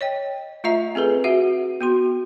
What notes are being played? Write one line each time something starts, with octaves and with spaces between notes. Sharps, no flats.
C#5 D#5 G5
A3 F4 D#5 E5 A#5
C4 G#4 A4 B4
F#4 E5 F#5
B3 F#4 C6